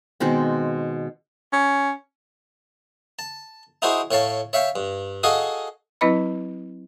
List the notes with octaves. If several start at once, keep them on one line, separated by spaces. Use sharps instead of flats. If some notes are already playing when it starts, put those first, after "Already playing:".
B2 D#3 G#3 C4
C#4
A5
D#4 E4 F#4 G#4 C5
A2 C#5 F5 A5
C#5 E5 F5 G5
G2
F#4 G#4 A4 D#5 F5 G#5
F#3 C4 E4 B4 D#5 B5